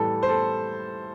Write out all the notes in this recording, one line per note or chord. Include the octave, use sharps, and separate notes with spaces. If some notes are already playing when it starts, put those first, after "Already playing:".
Already playing: A2 E3 G3 A4
C5
A4